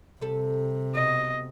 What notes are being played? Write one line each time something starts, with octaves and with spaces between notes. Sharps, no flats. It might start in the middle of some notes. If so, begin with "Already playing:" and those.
C3 G3 A4
B2 D#5